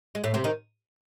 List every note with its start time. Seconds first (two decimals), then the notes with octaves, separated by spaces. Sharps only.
0.15 G#3
0.24 A2 A3
0.34 C3 C4
0.44 D#3 D#4